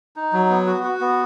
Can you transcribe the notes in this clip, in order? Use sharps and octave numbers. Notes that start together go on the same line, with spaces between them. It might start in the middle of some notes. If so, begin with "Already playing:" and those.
D#4
F#3
B3
F#4
F#4
B3